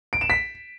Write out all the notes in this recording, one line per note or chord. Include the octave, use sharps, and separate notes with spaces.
D7
E7
B6